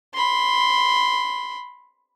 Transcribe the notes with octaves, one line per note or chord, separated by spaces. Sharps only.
B5 C6